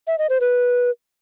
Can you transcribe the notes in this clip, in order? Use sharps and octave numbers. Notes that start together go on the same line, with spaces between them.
E5
D#5
C5
B4